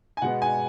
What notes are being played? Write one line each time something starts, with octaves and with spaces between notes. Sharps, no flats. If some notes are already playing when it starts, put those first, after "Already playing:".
G#5
B2 G#3 B3 F#5
G#5